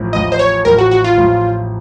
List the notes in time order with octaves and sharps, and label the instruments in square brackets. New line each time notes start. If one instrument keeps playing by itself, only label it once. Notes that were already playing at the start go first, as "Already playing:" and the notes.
Already playing: [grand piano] A1 A2 F3
[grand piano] A1 A2 F3 [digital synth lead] D#5
[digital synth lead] C5
C#5
[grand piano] A1 A2 F3 [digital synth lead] A#4
[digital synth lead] F#4
F#4
F4
[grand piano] A1 A2 F3